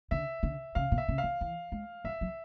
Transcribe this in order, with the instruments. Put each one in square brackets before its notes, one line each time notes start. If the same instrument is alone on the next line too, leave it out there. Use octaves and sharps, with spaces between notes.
[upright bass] D3 [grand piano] E5
[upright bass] D3
[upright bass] C#3 [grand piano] F5
[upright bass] B2
[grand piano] E5
[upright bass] C#3
[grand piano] F5
[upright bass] D#3
E3
G#3
[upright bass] G3 [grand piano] E5
[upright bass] F#3